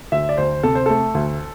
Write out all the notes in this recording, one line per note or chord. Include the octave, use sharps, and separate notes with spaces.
D2 E5
D5
D2 C5
C3 A4
C5
A3 A4
D2